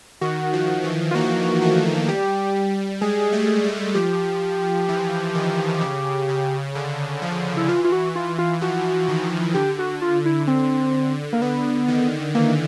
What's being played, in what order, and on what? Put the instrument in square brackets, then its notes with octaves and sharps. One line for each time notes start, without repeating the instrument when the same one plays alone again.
[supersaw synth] D#3 [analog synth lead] F#4
[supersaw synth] F3
E3
[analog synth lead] F4
[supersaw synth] A#3 [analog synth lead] F#4
[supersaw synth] A3
[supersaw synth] G3 [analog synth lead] G4
[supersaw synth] G#3 [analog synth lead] G#4
[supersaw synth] A3
G3
[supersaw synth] F3 [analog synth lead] G4
[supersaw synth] E3
D#3
C#3
C#3
D3
F3
[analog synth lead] E4
[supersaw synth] E3 [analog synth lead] F4
[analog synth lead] F4
F#4
F4
F4
[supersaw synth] F3 [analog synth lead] F#4
[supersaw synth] D#3
[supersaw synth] D3 [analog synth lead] G4
[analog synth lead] F#4
F4
E4
C4
A#3
[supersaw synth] D3 [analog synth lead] B3
[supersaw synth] D#3
[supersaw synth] E3 [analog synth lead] A#3